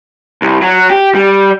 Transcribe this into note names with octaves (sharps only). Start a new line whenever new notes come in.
C2
F#3
G4
G3